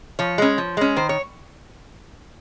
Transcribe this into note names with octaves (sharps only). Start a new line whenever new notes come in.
F3 C#5
G#3 C#4
F3
G#3 C#4
D#3 C5
C#5